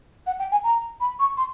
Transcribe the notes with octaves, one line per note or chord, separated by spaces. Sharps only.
F#5
G5
G#5
A#5
B5
C#6
C6